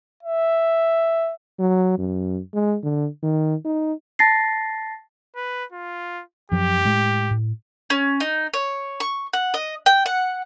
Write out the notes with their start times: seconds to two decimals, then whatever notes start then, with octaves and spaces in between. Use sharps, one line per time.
0.23 E5
1.59 F#3
1.99 F#2
2.54 G#3
2.83 D3
3.23 D#3
3.65 D#4
4.19 A5 A6 A#6 C7
5.36 B4
5.72 F4
6.52 F#2 F3 F#3 G4
6.85 A2 G#3 A3
7.31 A2
7.90 C#4
8.20 D#4
8.54 C#5
9.00 C#6
9.33 F#5
9.54 D#5
9.86 G5
10.06 F#5